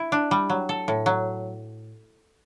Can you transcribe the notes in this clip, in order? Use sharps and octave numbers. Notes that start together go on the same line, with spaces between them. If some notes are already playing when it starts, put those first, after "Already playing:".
Already playing: E4
D4
G3
F#3
A4
A2
F#3